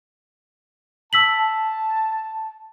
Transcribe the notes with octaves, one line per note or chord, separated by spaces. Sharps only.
A5 E6 B6 F#7